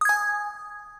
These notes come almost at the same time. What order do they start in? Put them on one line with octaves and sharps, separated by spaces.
D#6 G#6 G#5